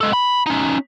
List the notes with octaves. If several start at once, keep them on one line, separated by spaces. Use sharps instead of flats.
G#3 A4
B5
C#4 D#4